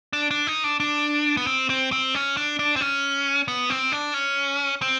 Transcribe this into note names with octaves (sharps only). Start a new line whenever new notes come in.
D4
D4
D#4
D4
D4
B3
C4
C4
C4
C#4
D4
D4
C4
C#4
B3
C4
D4
C#4
C4